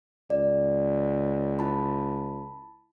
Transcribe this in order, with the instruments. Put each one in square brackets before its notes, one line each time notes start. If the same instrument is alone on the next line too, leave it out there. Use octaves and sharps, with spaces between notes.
[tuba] C#2 [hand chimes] D5
[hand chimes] E4 A5 B5